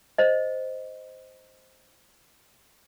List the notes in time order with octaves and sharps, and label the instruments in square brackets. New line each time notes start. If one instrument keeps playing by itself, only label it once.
[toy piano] C5 D#5